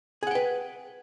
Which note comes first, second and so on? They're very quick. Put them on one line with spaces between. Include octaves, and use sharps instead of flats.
G#4 F#5 G5 B4